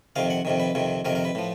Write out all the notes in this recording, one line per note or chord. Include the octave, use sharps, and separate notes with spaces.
F2 C3 D#3 F5
F#5
F2 C3 D#3
B4
F2 C3 D#3
F2 C3 D#3 A#4
A#4
B4
A2 F3